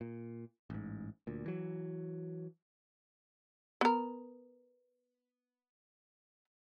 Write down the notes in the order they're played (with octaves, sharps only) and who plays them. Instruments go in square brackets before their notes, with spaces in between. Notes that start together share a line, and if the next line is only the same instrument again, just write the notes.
[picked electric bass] A#2
A1 G#2
D2 A#2
E3 F#3
[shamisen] B3 A#4